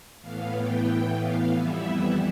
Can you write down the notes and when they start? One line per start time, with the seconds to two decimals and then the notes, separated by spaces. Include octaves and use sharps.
0.21 A2 E3 B3 F5
0.55 G5
1.20 F5
1.53 F2 E3 G3 B3 E4 E5